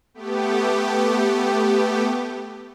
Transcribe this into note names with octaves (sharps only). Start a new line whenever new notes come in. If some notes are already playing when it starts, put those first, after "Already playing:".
A3 B3 G4